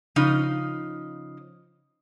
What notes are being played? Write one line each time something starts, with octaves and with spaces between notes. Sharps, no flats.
C#3 F3 D#4